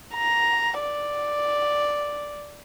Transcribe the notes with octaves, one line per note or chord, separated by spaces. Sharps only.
A#5
D5